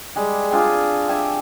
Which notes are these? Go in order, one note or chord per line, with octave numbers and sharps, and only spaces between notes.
G3 G#3 G4
C4 D4 F4 G#4
G4 E5 G#5